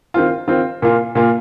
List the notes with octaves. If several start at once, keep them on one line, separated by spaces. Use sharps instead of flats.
D#3 C4 F4
D#3 C4 F4
A#2 A#3 F4
A#2 A#3 F4